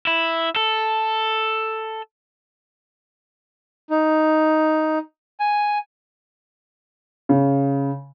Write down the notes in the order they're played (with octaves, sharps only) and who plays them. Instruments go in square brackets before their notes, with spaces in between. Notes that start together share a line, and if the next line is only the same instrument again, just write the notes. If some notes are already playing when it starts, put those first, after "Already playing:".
[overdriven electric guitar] E4
A4
[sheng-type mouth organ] D#4
G#5
[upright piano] C#3